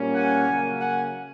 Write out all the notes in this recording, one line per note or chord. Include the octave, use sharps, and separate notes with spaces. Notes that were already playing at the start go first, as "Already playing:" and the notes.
Already playing: A#2 G3 A#3 C#4
F#5 G#5
C#3 F#3 A#3 C#4
F#5 G#5